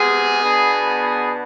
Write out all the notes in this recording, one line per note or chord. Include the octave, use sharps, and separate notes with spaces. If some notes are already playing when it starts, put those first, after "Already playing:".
Already playing: C3 G#3 B3 G#4
B2 B3 D4